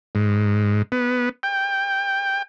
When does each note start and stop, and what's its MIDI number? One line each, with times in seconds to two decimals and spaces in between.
0.15 0.82 44
0.92 1.29 59
1.43 2.42 79